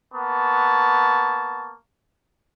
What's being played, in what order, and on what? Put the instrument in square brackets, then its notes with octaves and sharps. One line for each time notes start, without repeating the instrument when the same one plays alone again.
[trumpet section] A#3 B3 A5 C#6